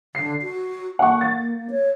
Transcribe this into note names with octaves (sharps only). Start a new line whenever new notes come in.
D3 C7
F#4
A#3 F#5 C#6
A6
C#5